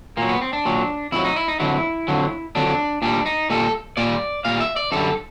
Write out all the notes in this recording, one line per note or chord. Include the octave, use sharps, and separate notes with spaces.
A#2 F#3 A#3
B3
C4
D4
A#2 F#3
F2 D3 F#3 E4
D#4
E4
D#4
F2 D3 F#3 E4
F2 D3 F#3
F2 D3 F#3 D4
A#2 G3 D4
D#4
A#2 G3 A4
A#2 G3 D5
A#2 G3 F5
E5
D5
F#2 D3 G3 A4